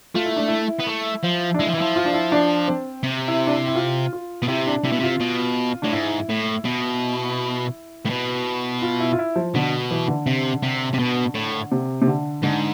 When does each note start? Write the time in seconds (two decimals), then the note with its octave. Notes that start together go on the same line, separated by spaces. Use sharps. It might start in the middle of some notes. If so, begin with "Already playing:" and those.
0.15 A3 F4
0.26 E4
0.36 D4
0.48 E4
0.79 B3
0.86 A3
1.23 F3
1.54 D4
1.59 G#3 E4
1.67 F3
1.74 E3
1.77 F3 E4
1.96 F4
2.05 D4
2.13 E4
2.32 D4
2.68 C4
3.03 C3
3.28 E4
3.47 D4
3.52 E4
3.67 E4
3.75 F4
4.13 F4
4.43 B2
4.48 C3 E4
4.67 D4
4.84 C3 E4
4.92 B2
5.00 C3 F4
5.20 B2
5.82 A2 D4
5.93 G#2 E4
6.29 A2
6.65 B2
8.06 A2
8.10 B2
8.82 F4
9.00 E4
9.13 F4
9.19 E4
9.36 F3
9.54 B2 D3
9.91 E3
10.08 D3
10.27 C3
10.63 C3
10.93 C3
10.99 B2
11.35 A2
11.72 C3
12.02 C3
12.08 D3
12.43 G#2 D3